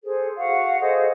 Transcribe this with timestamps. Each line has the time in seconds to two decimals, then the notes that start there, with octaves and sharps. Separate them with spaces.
0.03 G#4 A4 C5
0.36 F#4 F5 F#5
0.80 G#4 A4 C5 D#5